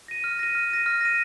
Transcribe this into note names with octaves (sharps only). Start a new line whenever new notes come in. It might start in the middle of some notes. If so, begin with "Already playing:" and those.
A#6 D#7
F6
A#6 D#7
F6
A#6 D#7
F6
A#6 D#7